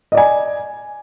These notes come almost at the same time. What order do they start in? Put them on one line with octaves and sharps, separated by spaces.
D#5 D5 G#5